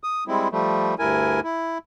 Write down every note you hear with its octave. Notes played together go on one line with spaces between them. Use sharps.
D#6
G3 G#3 C4 E4
F3 G3 A3
D2 G2 E4 A#4 G#5
E4